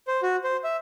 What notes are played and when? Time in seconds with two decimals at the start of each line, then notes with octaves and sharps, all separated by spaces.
0.07 C5
0.23 F#4
0.44 C5
0.64 E5